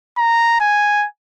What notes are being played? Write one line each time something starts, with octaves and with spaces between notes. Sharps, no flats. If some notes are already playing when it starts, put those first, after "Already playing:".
A#5
G#5